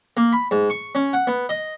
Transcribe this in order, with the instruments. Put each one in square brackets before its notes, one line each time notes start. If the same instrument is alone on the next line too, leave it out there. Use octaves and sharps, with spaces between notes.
[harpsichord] A#3
B5
G#2
C#6
C#4
F#5
B3
D#5